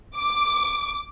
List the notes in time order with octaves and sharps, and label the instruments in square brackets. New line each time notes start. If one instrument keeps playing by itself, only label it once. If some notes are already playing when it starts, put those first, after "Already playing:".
[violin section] D6